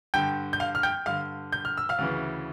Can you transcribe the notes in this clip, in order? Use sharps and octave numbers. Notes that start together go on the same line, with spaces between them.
G2 D3 G5 G6
G6
F5 F6
F6
G5 G6
G2 D3 F5 F6
G6
F6
E6
F5 F6
D2 C#3 E3